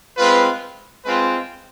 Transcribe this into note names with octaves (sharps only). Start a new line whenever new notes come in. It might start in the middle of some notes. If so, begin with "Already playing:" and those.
G#3 C4 F4 B4
G#3 C4 F4 B4